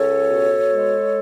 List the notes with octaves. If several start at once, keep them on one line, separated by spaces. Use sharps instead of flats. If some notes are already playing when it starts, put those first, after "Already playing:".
Already playing: C#2 A4 C#5
B2
G#3